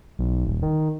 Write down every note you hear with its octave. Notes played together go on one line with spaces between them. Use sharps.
B1
D#1
D#3